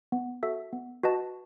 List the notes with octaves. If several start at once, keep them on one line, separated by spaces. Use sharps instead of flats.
B3
F#4 A4 E5
B3
F#4 B4 D#5 A5